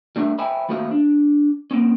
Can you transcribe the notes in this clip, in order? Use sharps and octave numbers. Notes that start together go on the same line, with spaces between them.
G3 A3 D4 E5
C5 E5 G5 G#5 B5
D#2 A3 F#4 C5 E5 F5
D4
A#3 C4 C#4